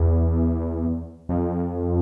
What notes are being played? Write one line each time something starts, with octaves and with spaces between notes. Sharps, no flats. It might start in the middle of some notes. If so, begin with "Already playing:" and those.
Already playing: E2
F2